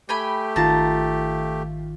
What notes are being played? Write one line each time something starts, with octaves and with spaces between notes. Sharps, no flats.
A3 G4 G5 G#5 B5
G#1 D#3 F4 A5 A#5